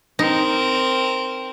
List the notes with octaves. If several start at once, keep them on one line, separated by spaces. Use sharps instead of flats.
C4 D#4 A#4